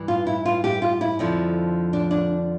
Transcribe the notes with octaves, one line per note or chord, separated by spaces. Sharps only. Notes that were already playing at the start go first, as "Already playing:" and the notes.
Already playing: G2 E3
F4
E4
F4
G4
F4
E4
F2 D3 F3
D4
D4